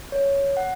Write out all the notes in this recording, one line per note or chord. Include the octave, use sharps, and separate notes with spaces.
C#5
F#5